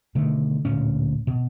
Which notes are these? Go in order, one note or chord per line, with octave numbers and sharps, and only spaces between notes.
B2 D3 D#3 A3
D1 D2 A#2 C#4
B2